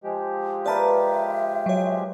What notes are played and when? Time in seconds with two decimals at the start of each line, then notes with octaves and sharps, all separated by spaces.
0.04 F3 G#3 G4
0.66 A#4 B4 D5 E5 A5 B5
1.66 F#3 C#5